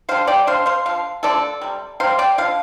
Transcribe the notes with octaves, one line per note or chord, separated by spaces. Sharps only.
D3 G3 C5 F5
D5 G5
D3 G3 C5 F5
C5 F5
D3 F3 F5
D3 F3 A3 A4 D5
C3 G3
C3 G3 C5 F5
D5 G5
D3 F3 F5